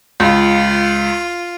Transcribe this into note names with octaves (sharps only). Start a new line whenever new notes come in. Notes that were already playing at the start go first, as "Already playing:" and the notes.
C#2 F4